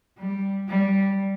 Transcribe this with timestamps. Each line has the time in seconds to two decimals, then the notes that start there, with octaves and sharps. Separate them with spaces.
0.17 G3
0.68 G3